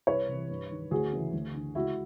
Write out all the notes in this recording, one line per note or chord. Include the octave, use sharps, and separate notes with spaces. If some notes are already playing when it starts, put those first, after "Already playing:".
C2 B4 C#5
C3 E3
G2
D#3
D2 F#4 G#4
C#3 E3
D2
D3
C#2 E4 F#4